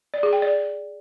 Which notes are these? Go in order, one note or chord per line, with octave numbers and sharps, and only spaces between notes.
D5
G#4
G5
D5